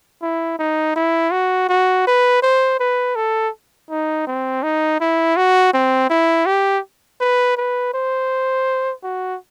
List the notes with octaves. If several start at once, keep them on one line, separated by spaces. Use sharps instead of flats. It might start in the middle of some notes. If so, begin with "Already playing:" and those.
E4
D#4
E4
F#4
F#4
B4
C5
B4
A4
D#4
C4
D#4
E4
F#4
C4
E4
G4
B4
B4
C5
F#4